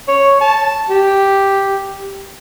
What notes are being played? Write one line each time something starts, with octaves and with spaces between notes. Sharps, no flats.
C#5
A5
G4